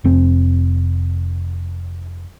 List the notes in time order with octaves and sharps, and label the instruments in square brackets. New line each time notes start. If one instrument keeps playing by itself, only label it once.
[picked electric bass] F1 C4